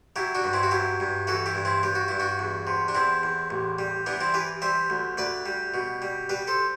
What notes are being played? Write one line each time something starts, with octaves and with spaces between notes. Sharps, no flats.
F#3 E4 G4
D4 F#4
G2
C4 E4
F#4
F#3 E4 G4
G2
E3 F#4 A4
E4 G4
G2
C4 E4
G2 G4
F#4
G2 E4
D4 F#4
E2
C3
D4
E2 C4 E4
E2
A1
G3
E3 B3 D4
C4 E4
E3 G4 B4
G3 C5 E5
D2
D2 B4 D5
G3
B2
G3
G3 G4 B4
A4 C5